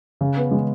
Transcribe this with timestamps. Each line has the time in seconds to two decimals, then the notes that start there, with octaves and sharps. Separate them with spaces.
0.21 C#3
0.37 B3
0.51 G#3